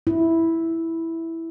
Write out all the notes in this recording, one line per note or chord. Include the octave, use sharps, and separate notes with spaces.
E4